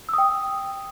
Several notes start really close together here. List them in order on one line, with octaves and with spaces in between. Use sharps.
E6 D#6 G5